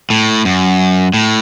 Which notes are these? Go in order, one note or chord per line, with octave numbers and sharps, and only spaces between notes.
A2
F#2
A2